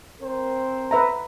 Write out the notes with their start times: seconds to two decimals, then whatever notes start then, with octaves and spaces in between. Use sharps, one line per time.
0.20 C4 A#4 C5
0.91 B4 E5 A#5